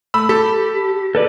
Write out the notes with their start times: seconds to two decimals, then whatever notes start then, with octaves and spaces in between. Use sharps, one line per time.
0.14 A3 B5 E6
0.29 G4 A4 B5
1.15 A4 B4 D5